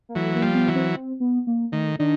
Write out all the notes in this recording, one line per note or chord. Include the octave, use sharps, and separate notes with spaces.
A#3
E3 F#3 A3
A#3
F3 G3
B3
E3 F#3
C4
C4
B3
A#3
D#3 A3
D#3 D4